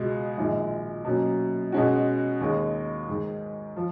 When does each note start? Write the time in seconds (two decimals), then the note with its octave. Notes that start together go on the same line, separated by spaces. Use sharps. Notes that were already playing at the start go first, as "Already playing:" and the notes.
Already playing: C#2 B2 G#3
0.37 A#1 G#2 D#3 G#3
1.04 B2 F#3 A#3 C#4
1.72 B2 G#3 C#4 F#4
2.41 D#2 D#3 G#3
3.08 G#2 D#3 G#3
3.76 F3